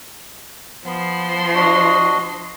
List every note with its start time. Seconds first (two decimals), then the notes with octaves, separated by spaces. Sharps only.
0.85 F3 B3 C6
1.54 D4 F#4 D#5